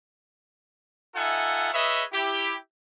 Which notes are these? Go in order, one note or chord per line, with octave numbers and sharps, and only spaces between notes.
D#4 F4 A4 E5 F#5 G#5
G#4 B4 C#5 D#5 E5
E4 G4